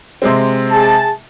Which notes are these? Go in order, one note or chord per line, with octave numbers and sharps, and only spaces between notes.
C3 G#3 C4
G#4 A5